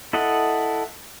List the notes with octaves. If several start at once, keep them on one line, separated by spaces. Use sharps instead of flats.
E4 A4 D#5 F#5